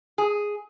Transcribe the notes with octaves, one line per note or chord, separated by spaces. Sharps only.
G#4